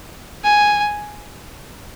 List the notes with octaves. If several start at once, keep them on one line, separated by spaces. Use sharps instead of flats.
G#5